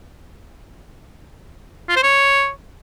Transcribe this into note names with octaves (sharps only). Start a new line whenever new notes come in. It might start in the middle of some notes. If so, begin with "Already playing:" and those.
F4
C5
C#5